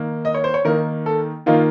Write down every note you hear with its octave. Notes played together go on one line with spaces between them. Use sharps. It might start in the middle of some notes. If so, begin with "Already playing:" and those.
Already playing: D#3 A#3 D#4
D#5
C#5
C5
C#5
D#3 A#3 D#4 A#4
A4
D#3 A#3 D#4 F4